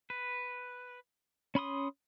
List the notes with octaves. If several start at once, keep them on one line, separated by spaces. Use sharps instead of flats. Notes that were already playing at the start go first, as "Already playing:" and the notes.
B4
C#4 B5 C6 D#6